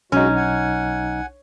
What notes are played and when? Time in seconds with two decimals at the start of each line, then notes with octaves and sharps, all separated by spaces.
0.12 B1 F#3 G#3 C#4 D#4 F#4
0.35 F#5 G#5